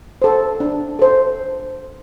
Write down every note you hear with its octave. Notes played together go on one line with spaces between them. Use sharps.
A4 C5
D4
A4 C5